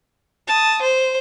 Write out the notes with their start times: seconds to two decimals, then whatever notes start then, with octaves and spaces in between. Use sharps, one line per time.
0.47 A5 D#6
0.82 C5